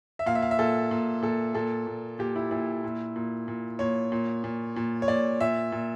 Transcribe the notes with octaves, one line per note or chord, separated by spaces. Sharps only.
E5
A#2 F5
E5
F5
E5
A#2 A4
A#2
A#2 A4
A#2 A4
A#2
A#2 G4
E4
A#2 E4
A#2
A#2
A#2
A#2 C#5
A#2
A#2
A#2
C#5
A#2 D5
A#2 E5
A#2